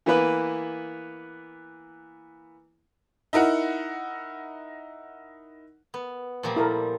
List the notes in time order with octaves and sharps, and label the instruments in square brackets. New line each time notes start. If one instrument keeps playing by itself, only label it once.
[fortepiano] E3 A#3 B3 B4
[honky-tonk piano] D#4 E4 A#4 F#5
[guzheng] B3
A#2 F3 G3
[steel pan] E4 A4 A#4